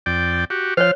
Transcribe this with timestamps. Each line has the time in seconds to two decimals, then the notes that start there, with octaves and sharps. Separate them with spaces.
0.06 F2 D5 G5
0.50 F#4 G4
0.77 F3 C5 C#5 F5 F6